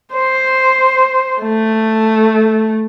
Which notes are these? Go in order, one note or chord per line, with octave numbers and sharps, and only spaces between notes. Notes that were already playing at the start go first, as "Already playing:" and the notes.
C5
A3